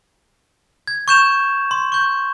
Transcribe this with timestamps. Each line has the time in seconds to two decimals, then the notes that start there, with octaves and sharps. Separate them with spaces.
0.87 G#6
1.08 C#6 G6 E7 F7
1.71 C6
1.92 C#6 G6